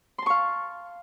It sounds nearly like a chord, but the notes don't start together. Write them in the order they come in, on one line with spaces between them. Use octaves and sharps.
C6 A5 C#6 F5